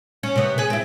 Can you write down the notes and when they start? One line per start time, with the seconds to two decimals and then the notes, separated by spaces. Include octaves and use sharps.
0.23 C#4
0.36 C3 B3
0.58 G#4 B4
0.70 C4 E4